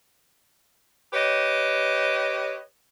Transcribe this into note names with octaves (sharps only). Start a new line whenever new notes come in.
G4 B4 C#5 D#5